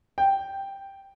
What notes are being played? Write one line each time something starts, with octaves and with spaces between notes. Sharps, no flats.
G5